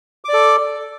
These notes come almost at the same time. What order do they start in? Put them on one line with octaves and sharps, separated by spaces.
D6 D5 A4